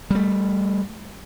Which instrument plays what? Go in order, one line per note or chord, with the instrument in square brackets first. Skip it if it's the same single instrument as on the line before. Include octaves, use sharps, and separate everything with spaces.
[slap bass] G3 A3